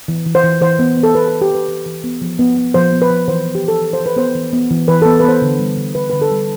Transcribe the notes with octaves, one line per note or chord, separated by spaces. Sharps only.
E3
E3
C5
E3
E3 C5
B3
B3
A4
B3 B4
B3 A4
G4
E3 B4
E3
E3
B3
F3
B3
B3
F3 C5
B3
B4
F3
E3 C5
B3
G4
E3 A4
E3
C5
E3
B4
B3 C5
E3
B3
E3
E3 B4
B3 A4
B4
B3 C5
D3
G3
D3
D3 B4
D3 B4
A4
G3